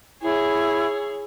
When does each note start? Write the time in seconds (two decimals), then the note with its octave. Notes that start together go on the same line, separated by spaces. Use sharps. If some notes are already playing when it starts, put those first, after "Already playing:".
0.22 E4 G#4 C#5